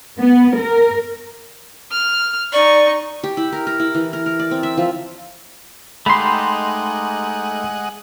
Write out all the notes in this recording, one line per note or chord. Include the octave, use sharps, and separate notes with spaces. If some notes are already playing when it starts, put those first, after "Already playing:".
B3
A#4
F6
D#4 D5 C#6
G4
E4
A#4
A#4
E4
E3
A#4
A#4
D5
C4
E5
F3
G#3 A3 D#4 G4 D#5 F#5 B5 C6